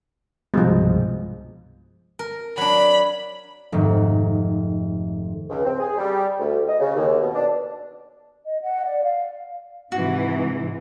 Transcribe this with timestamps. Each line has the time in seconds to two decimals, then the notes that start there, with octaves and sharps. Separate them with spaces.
0.54 C2 G2 B2 F3 G#3
2.19 A#4
2.58 F#3 D4 B5
3.72 F1 G#2 D#3
5.50 C#2
5.65 C4
5.80 G#4
5.97 G3
6.39 D2
6.67 D#5
6.80 C#3
6.95 D#2
7.21 B2
7.34 D4
8.45 D#5
8.61 F#5
8.83 D5
9.04 F5
9.92 G#2 C3 E3 F#4